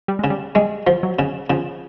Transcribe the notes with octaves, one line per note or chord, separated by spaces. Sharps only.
G3
C#3 G#3
G3
G3 G#3
F3
F#3
C#3
C#3 F3